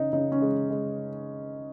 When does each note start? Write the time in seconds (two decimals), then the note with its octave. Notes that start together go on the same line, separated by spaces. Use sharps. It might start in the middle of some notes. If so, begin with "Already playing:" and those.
Already playing: C#3 D#4
0.13 C#3 D#4
0.32 C#4
0.41 G#3
0.70 G#3